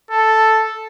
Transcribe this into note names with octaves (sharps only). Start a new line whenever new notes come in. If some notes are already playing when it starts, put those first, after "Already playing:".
A4